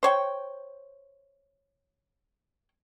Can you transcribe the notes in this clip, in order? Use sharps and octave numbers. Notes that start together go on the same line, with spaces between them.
C5 C#5 G5